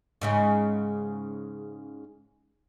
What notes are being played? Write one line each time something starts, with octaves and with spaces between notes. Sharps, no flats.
G#2 C#3 G#3